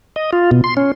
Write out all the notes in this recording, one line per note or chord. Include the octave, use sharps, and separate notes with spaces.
D#5
F4
B2
C6
C#4